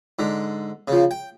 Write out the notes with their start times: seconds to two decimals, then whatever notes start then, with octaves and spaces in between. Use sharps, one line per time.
0.19 G#2 D3
0.88 C#3 F3
1.11 G5